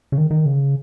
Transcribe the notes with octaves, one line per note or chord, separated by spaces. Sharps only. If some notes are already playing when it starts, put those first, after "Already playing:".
C#3
D#3
D#3
C#3